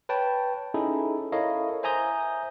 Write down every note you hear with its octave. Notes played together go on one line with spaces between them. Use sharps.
B4 C#5 G5 A5
C#4 D#4 E4 G#4 A4
E4 A4 A#4 C#5 D#5 F5
C5 E5 G#5 A#5 D#6 G6